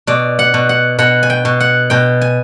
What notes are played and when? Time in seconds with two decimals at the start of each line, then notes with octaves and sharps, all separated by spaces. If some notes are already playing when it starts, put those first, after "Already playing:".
0.07 B2 D5
0.39 F#5
0.54 B2
0.69 F#5
0.99 B2 F#5
1.23 G#5
1.30 G5
1.45 B2
1.60 F#5
1.90 B2 G5
2.21 G#5